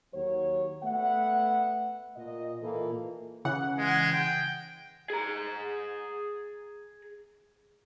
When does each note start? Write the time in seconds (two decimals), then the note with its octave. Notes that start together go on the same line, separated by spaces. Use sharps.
0.14 D#2 F#3 C#5
0.83 A3 B3 E5 F#5
2.17 A#2 D#5
2.62 A#2 E3 A#3 A4
3.45 C#3 E3 F#5
3.78 G#3
4.12 G5
5.10 G#4 A#5